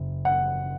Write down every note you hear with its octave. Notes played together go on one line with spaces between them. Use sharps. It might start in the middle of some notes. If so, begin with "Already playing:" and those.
Already playing: F#1
F#5